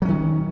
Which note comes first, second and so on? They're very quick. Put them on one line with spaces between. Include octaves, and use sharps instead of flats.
F#3 C#4 D#3